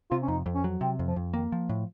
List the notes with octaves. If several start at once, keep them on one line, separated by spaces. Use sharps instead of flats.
C3 F4
C#4
F2 D#4
F2
C#4
F#3
C3 C4
F2
F3
F2
D#3 A#3
F3
A2